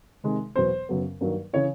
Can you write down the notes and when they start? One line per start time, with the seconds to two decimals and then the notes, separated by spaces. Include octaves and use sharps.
0.24 C3 D#3 G#3
0.56 E2 B2 F#3 B3 C5
0.89 F#2 C#3 F#3 B3
1.21 G2 D#3 F#3 A#3
1.53 C#3 E3 C#5